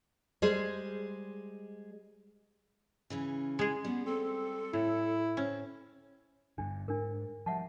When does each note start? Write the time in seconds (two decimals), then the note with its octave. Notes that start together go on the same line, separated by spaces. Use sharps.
0.42 G3 G#3 G#4 C5
3.10 C#3 E3 C#4
3.59 G#3 G#4
3.85 G3 B3
4.06 C4 A4
4.73 A2 E4
5.37 C4 C#4
6.58 G2 D3 D4
6.88 G#2 D4 A#4
7.46 F3 G3 E5 F#5 A5